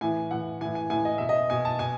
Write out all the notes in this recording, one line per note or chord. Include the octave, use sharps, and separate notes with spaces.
A2 E3 G#5
A2 E3 F#5
A2 E3 G#5
G#5
A2 E3 G#5
D#5
B2 E5
D#5
B2 G#5
A5
B2 G#5